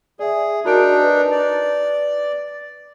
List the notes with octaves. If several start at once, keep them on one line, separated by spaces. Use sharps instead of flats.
G#4 D5 E5
D4 D#4 F#4 A#4 D7
B4
D5